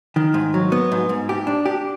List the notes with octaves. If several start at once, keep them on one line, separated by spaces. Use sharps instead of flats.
D#3
G#2
F#3
B3
G#2
G#2
G4
D4
G4